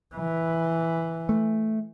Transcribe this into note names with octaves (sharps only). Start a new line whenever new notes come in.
E3
A3